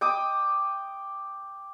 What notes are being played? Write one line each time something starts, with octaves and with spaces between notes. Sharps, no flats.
G5 D6 D#6